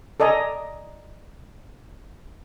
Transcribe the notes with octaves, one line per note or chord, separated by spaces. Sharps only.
A4 D5 D#5 G#5 A#5